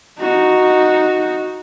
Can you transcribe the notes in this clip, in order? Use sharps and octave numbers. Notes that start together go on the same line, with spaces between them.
D#4 F#4